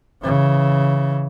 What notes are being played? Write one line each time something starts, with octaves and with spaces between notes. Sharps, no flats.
C#3 E3